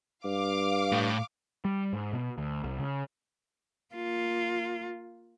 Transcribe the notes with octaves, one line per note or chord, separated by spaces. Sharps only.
G2 F5 D6
A2
G3
G#2
B2
D2
C2
C#3
A#3 F4